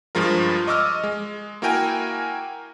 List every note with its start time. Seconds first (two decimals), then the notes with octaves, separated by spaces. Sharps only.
0.15 G2 F3 G#3 F4 A#4
0.67 D#5 C#6 D6 E6 F6
1.04 G#3
1.62 A#3 E4 F#4 A#4 G5 G#5